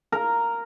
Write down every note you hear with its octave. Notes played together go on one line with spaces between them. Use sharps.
A#4